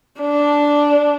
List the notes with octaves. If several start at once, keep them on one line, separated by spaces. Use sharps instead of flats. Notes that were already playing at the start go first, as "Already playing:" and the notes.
D4